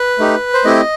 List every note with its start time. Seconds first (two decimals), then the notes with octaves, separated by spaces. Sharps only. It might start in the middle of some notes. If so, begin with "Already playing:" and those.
Already playing: B4
0.19 A3 D#4 G4
0.54 C5
0.65 A3 C4 E4 G4 D#5